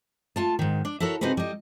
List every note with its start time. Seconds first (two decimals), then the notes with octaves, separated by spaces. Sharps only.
0.36 A3 F4 A5
0.59 G#2 D#3
0.85 D4
1.00 E4 F#4 A4 A#4 C#5
1.21 C3 D#4 F#4 G#4 B4 C5
1.37 G3 D#5